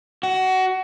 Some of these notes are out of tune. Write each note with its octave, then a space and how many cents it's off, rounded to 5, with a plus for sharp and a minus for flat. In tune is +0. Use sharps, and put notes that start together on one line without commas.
F#4 +20